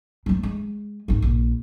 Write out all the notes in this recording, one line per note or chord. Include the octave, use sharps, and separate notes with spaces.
F#3 A3
G#3
G#1 D#4
A#1